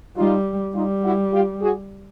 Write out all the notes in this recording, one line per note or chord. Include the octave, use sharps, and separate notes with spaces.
G3 D#4 F4
G3 D#4 F4
E4 F#4
F4 G4
F#4 G#4